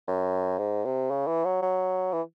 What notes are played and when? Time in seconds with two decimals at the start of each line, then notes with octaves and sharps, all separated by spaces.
0.08 F#2
0.58 G#2
0.85 C3
1.11 C#3
1.27 E3
1.45 F#3
1.62 F#3
2.13 E3